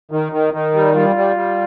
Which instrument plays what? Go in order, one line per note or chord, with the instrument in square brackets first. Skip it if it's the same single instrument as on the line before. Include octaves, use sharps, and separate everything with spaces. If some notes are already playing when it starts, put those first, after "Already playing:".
[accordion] D#3 [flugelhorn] D#4
[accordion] D#3
[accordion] D#3 [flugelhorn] D#4
[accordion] G3
[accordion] G3 [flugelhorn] F4
[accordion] G3
G3